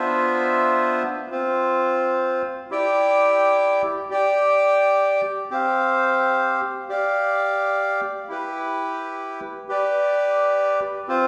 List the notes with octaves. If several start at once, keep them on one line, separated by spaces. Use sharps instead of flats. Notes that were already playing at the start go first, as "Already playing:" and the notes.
Already playing: B3 D4 F4 C5 E5
C4 F4 C5
E4 G4 D5 G5
G4 D5 G5
C4 G4 C5 F5
G4 D5 F5
E4 G4 B4
G4 B4 D5
C4 F4 C5